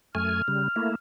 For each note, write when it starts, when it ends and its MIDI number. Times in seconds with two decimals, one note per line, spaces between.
0.15 0.42 42
0.15 0.42 57
0.15 0.42 80
0.15 0.93 89
0.48 0.68 49
0.48 0.68 55
0.76 0.95 57
0.76 0.95 58
0.76 0.95 64